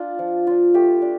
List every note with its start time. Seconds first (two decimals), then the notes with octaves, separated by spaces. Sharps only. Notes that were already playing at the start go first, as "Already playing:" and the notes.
Already playing: D4 F4
0.19 F3
0.47 D4 F4
0.74 A3 G4
1.02 D4